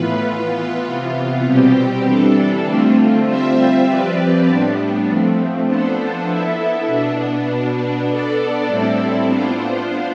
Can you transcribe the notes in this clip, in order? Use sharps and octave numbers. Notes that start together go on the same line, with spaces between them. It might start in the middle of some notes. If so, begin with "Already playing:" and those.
Already playing: A2 E3 B3 F4 B4
E3 B3 F4 B4
C3 E3 B3 F4
B2 G3 C4 G4
E3 G3 D4 A4
D3 A3 C4 F4
G3 C4 F4 C5 E5
F3 C4 G4 B4 D5
A2 G3 B3 D4
F3 A3 C4
F3 B3 D4 A4 C5
B3 E4 A4 E5
B2 B3 D4
B2 B3 D4
B3 D4 A4 D5
A2 G3 C4 E4 A4
B3 D4 F4 C5